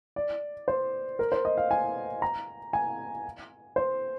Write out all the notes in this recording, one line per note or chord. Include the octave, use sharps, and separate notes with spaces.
D5
C5
A#4
C5
D#5
F5
G#5
A#5
G#5
C5